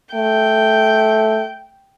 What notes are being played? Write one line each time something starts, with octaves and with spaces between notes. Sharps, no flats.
A3 G5